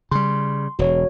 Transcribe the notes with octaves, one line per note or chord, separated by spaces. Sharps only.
C#3 G3 C6
E1 F#4 C#5